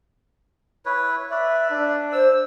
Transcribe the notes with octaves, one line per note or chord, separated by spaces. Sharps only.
E4 B4 C#5
B4 D5 E5
D4
C5 E6